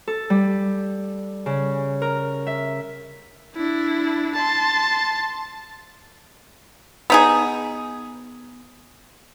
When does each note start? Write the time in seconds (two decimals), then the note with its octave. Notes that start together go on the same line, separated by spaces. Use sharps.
0.08 A4
0.30 G3
1.46 C#3
2.02 A#4
2.47 E5
3.56 D4 E4
4.35 A5 C6
7.10 B3 D#4 G#4